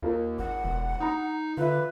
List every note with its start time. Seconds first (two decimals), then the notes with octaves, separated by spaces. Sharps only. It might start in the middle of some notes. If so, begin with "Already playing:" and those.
0.02 D#2 F4 G4 A#4
0.39 G#1 F#5
0.64 E1
1.00 D#4 A#5 D#6
1.57 D3 F4 B4 E5